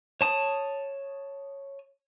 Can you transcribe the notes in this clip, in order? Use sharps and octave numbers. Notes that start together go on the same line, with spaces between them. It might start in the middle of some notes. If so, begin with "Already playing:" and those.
C#5 A5 D#6